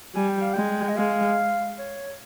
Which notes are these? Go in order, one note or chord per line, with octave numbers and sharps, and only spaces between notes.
G3 G#5
G5
F5
G#3 G5
D#5
G#3 F5
C#5